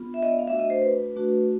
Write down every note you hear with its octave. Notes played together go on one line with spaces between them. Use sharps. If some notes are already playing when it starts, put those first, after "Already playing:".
Already playing: B3 D4 F4
E5
D#5
D5
F5
A3 D4 F#4 E5
D#5
C5
B4
A3 D4 F#4